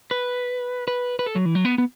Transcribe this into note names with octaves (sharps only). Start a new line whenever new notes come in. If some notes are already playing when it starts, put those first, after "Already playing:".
B4
B4
B4
A4
F#3
E3
F#3
B3
B3